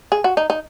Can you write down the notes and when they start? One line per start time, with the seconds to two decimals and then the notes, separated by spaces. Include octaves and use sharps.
0.12 G#4
0.24 F#4
0.37 D#4
0.50 D#4